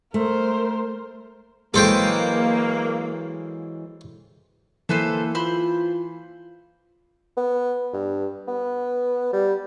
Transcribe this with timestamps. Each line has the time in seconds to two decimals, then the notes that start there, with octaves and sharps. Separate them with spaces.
0.14 A3 A#4 C5
1.74 E3 F#3 G#3 A#3 A4 C5 G5
4.89 E3 A#3 A4 B4 C5
5.35 F4 C5 B5
7.37 B3
7.93 G2
8.48 B3
9.33 G3